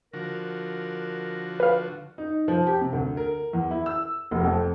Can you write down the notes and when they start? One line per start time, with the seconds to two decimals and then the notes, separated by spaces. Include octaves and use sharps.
0.14 D3 F3 F#4 A#4
1.60 B4 F5
2.18 D#4
2.48 F3
2.67 G4
2.81 C3
2.93 D2
3.17 A#4
3.53 E2
3.71 E4
3.86 E6
4.31 F1
4.44 F2